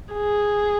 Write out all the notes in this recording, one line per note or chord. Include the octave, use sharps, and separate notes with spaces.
G#4